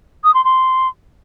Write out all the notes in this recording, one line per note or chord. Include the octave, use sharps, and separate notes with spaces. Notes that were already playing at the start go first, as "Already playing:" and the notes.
D#6
C6
C6